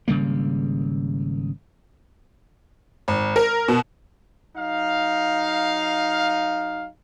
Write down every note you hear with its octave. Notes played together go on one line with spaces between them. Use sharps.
G#1 C#3 G3 A#3
G#1
A#4
B2
F#3 D#4 F5